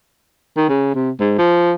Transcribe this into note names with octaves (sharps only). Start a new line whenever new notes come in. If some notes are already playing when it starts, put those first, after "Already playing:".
D#3
C#3
C3
G#2
F3